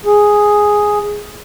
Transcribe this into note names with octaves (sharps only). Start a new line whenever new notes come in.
G#4